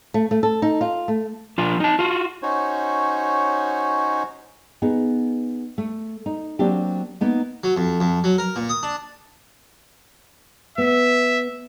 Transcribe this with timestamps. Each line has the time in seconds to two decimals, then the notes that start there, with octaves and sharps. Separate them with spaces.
0.14 A3
0.31 A3
0.43 A4
0.62 D#4
0.81 F4
1.08 A3
1.58 F3 D4 F4
1.80 D#4 A5
1.99 F4 F#4
2.42 C#4 D#4 F#4 C5 C#5
4.82 B3 D#4 G#4
5.78 A3
6.26 D#4
6.59 F#3 A#3 C4 D4 F#4 G4
7.21 A#3 B3 D#4
7.64 F#3
7.76 F2
8.00 F2
8.24 F#3
8.38 A#4
8.56 A#2
8.69 D#6
8.83 D4
10.78 B3 E5